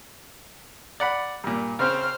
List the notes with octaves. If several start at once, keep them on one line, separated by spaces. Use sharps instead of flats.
D5 F#5 B5
G2 A#2
C#3 C4 C5 F6